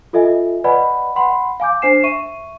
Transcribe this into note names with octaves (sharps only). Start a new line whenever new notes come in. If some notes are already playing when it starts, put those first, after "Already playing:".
F4 A4 D#5 E5 G#5
B4 D5 D#5 F#5 G#5 B5
F#5 B5 C6
F5 G#5 D6 G6
D4 C5 G#5 C7 E7
E5 C#6 D#7